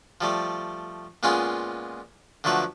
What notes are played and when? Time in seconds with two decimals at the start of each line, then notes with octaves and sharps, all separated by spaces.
0.21 F3 G3 A3
1.23 A#2 G#3 B3 C#4 F4 G#4
2.44 D3 F3 F#3 A3 B4